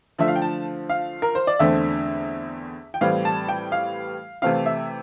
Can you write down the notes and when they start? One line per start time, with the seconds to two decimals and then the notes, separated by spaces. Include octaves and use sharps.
0.18 D3 F3 A3 E5
0.28 F5
0.36 G5
0.42 A5
0.89 F5
1.22 A#4
1.35 C5
1.47 D5
1.59 E2 D3 A3 C4 E5
2.94 G5
3.01 A2 E3 G3 C4 F5
3.25 A5
3.49 G5
3.72 F5
4.42 C3 E3 A3 C4 F5
4.66 E5